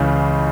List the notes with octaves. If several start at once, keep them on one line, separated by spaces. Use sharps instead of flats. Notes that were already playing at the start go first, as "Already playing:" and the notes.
Already playing: C#2 C#3 E3